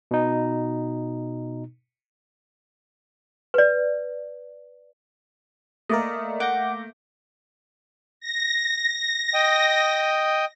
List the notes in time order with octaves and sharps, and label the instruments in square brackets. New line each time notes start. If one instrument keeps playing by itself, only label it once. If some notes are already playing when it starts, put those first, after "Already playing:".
[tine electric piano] B2 D#4
[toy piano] B4 D5
[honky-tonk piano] A3 A#3 [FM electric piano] A#4 D5 D#5
[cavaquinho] F#5 [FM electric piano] D6 G6 A#6
[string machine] A#6
[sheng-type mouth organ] D#5 G5 D#6